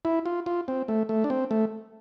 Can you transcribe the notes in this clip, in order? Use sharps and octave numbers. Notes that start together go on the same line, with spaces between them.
E4
F4
F4
C4
A3
A3
D4
C4
A3